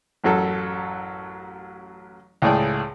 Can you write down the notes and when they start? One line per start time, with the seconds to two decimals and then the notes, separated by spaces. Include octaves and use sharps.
0.24 A1 F#2 F#3 A4
2.42 C#2 A2 G#4 D5 G5